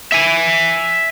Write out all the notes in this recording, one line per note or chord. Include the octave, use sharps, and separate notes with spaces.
E5 G#5